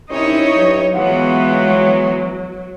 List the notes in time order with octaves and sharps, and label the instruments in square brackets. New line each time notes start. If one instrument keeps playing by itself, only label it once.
[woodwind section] C3 D#3 C#4 [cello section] D#4 C#5 [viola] E4 D#5
[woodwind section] G2 F#3
[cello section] E3 G#3 B3 [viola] F#3 [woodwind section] F4 C#5 F#5